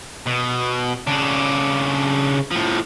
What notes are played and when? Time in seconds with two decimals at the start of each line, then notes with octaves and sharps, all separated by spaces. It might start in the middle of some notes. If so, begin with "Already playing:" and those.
0.27 B2
1.07 C#3 D4
2.51 A2 F3